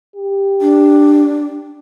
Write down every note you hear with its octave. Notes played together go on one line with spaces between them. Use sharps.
G4
D4